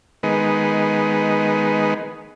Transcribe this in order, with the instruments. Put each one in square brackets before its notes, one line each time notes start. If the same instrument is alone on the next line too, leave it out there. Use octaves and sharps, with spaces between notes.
[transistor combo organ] D#3 G#3 B3